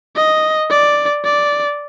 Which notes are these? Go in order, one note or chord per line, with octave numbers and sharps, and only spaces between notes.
D#5
D5
D5